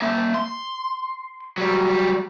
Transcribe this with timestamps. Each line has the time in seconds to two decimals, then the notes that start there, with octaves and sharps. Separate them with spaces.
0.02 A#3 E5
0.34 C6
1.58 F#3 G3